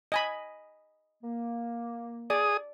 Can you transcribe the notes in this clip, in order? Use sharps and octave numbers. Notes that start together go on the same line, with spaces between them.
D#5 G#5 B5
A#3
G#4 D5 D#6